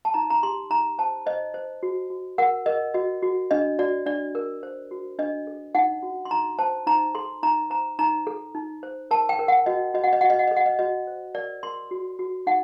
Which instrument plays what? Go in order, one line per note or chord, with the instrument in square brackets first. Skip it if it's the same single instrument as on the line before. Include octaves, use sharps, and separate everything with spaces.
[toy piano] A5
D#4 A#5
A#5
G4 C6
D#4 A#5
C5 A5
C5 D#5
C5
F#4
F#4
A#4 F#5
A#4 D#5
F#4 D#5
F#4
D4 D#5
F#4 D5
D4 D5
A#4
C5
F#4
D4 D#5
A4
D#4 F#5
F#4
C6
D#4 A#5
C5 A5
D#4 A#5
A4 C6
D#4 A#5
C5 A#5
D#4 A#5
A4
D#4
C5
A#4 A5
G5
A#4
F#5
F#4 D#5
F#4 D#5
F#5
D#5
F#4 F#5
D#5
F#5
A4 D#5
F#5
D#5
F#4 D#5
C5
A#4 D5
A#4 C6
F#4
F#4
D#4 F#5